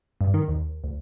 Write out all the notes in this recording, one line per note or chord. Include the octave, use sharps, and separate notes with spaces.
G2
D#3
D#2
D2